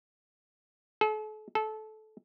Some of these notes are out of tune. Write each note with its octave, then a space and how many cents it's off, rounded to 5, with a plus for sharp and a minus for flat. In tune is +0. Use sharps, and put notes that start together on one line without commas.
A4 -40
A4 -20